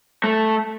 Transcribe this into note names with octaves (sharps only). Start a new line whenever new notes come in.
A3